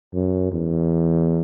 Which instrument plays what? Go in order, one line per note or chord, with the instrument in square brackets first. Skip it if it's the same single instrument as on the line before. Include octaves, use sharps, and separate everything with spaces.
[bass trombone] F#2
E2